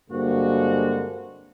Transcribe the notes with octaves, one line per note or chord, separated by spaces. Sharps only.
G2 D3 G#3 A#3 C4 F#4